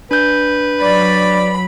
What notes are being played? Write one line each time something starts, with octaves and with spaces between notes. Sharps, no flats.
D4 B4 G6
F#3 D5 B5